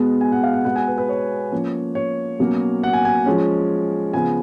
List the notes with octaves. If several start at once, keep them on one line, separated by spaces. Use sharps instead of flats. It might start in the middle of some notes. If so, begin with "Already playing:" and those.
Already playing: B2 G#3 B3
G#5
F#5
F5
F#5
B2 G#3 B3 F#5
G#5
B4
B4
C#5
F3 A#3 C#4
C#5
B2 F#3 A#3 C#4
F#5
G#5
G#5
F3 G#3 C#4
C#3 F3 B3 G#5